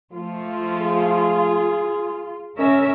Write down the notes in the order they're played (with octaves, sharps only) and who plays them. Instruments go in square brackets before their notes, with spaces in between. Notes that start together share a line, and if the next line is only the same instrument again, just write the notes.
[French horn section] F3 A3 [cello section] F4
[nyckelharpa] G#4
[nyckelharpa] C#4 [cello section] A#4 E5